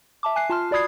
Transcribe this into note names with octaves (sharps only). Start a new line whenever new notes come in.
E5 A5 D6
G#5 F#6 C7
F4 A5 C6 F6
F#4 D5 B5 D#6 G#6 C7